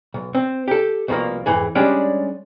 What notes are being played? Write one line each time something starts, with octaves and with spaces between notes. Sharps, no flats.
B1
C4
G4 A4
C2 B2 F3 A3 A#3
F2 G#2 E3 G#4
G3 G#3 C#4 D4 G4 D5